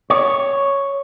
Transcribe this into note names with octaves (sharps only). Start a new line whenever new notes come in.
C#5